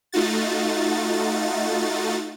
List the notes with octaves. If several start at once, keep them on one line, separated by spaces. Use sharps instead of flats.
A3 D#4 F4 F#4 A6